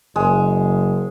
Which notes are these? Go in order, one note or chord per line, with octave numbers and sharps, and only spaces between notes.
F#1 G#3